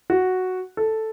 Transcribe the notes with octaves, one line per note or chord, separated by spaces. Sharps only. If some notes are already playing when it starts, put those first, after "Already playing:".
F#4
A4